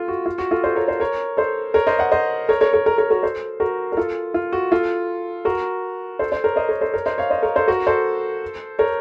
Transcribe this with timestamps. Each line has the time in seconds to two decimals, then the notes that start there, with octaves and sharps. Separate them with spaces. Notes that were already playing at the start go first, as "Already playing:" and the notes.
Already playing: F4 A4
0.08 F#4
0.26 F4
0.38 F#4
0.51 F4 A4
0.64 A4 C5
0.76 A#4 C#5
0.88 A4 C5
1.00 A#4 C#5
1.37 A4 C5
1.74 A#4 C#5
1.87 C5 D#5
1.99 D#5 F#5
2.12 C5 D#5
2.49 A#4 C#5
2.61 A#4 C#5
2.73 A#4 C#5
2.86 A#4 C#5
2.98 A#4 C#5
3.11 F#4 A#4
3.23 A4 C5
3.60 F#4 A#4
3.92 A#4
3.97 F4 A4
4.34 F4
4.53 F#4
4.71 F4 A4
5.45 F#4 A#4
6.19 A4 C5
6.32 A4 C5
6.44 A#4 C#5
6.56 C5 D#5
6.69 A#4 C#5
6.81 A4 C5
6.93 A#4 C#5
7.06 C5 D#5
7.18 C#5 F5
7.31 C5 D#5
7.43 A#4 C#5
7.56 A4 C5
7.68 F#4 A#4
7.87 A4 C5
8.79 A#4 C#5